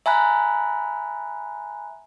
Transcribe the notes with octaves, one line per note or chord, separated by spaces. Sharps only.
E5 G#5 A#5 B5 F#6